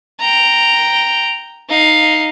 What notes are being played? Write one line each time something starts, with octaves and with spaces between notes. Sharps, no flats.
G5 A#5
D#4 F5